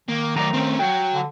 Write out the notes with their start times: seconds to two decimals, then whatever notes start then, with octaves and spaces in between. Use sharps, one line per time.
0.08 D#3 A#3
0.36 F#3 A3 D5 A#5
0.53 C4 C#4
0.79 F#3 F#5 G5
1.14 D3